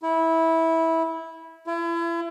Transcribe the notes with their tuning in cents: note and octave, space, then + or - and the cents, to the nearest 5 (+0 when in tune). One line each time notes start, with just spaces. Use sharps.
E4 -15
E4 +40